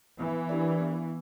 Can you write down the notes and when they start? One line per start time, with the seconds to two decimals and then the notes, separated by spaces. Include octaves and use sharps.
0.19 E3 B3
0.49 D4 G4 A#4 D5
0.80 B3